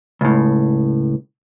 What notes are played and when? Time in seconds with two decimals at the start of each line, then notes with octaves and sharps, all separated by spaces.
0.21 C#2 A2